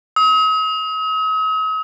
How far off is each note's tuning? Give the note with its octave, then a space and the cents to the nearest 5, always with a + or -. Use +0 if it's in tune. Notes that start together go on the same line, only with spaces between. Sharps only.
D#6 +45